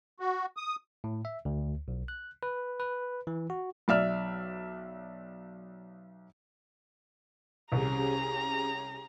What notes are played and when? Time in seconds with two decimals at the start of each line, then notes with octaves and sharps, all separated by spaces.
0.20 F#4
0.57 D#6
1.04 A2
1.25 E5
1.45 D2
1.88 B1
2.08 F#6
2.43 B4
2.80 B4
3.27 E3
3.50 F#4
3.88 B1 D5 E5 F6
7.72 C2 C#4 G4 G#4 A#5